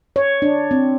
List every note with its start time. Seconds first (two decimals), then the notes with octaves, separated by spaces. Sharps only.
0.16 C#5
0.42 D4
0.71 C4